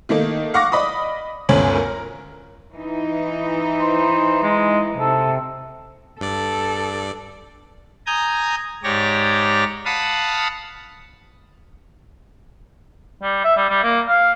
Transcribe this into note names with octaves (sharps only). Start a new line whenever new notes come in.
D#3 A3 A#3 D#4
F5 F#5 C#6 D6 A#6
D5 D#5 B5 D6 D#6
G1 D2 C#4 C#5 G#5 F#7
A#4
E3 D#4
C5
G#3
C3 A4
G2 A4 D5
G#5 A#5 D#6 G6
G#2 G4 C#5 D5 A#6
F5 F#5 A5 B5 D#6
G3
E5
G3
G3
A#3
F5